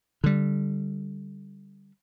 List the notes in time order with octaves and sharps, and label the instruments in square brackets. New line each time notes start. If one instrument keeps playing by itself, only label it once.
[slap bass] D3 G3